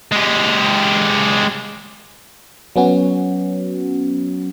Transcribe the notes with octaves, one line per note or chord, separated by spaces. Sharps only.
G#3 G4
F#3 B3 C#4 F#4